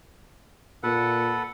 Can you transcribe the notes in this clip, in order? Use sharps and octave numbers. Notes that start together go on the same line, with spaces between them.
A#2 A4 B4 F#5